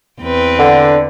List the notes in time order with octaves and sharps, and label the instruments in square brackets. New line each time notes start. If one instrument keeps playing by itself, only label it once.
[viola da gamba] E2 C4 B4
[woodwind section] D3